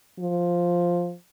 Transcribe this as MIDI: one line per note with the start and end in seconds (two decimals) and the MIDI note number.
0.19 1.14 53